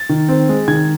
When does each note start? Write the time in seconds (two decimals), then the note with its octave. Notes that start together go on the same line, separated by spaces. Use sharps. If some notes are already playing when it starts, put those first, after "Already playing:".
Already playing: A6
0.09 D#3
0.28 C4
0.49 G#3
0.68 D#3 G#6